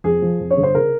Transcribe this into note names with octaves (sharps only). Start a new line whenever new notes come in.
F2 G#4
F3
F2
C#5
G1
C5
C#3 A#4